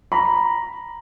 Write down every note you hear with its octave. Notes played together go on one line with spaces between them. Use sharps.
A#5 B5